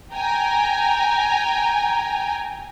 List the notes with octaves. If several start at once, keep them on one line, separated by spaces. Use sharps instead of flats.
G5 G#5 A#5